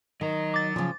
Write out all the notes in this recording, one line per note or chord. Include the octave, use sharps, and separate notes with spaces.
D#3 F#3 D#5 A#5
D6 A6
C#3 F3